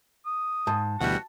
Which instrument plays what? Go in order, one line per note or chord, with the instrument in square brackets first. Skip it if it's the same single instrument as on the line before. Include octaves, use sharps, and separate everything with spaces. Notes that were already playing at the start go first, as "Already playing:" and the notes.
[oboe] D#6
[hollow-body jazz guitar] G#2 [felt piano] A5
[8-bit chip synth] D2 B2 E3 [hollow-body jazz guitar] G3 F#5 [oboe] F#4